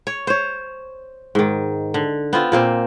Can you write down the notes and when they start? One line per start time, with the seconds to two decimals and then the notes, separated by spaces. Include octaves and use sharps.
0.07 C#5
0.27 C5 C#5
1.35 G#2 D#3
1.94 D3
2.33 B3 C4 F4
2.52 A#2 A#3 C4